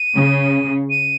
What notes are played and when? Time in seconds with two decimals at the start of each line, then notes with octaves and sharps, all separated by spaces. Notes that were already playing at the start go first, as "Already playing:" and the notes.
Already playing: D#7
0.15 C#3
0.90 D#7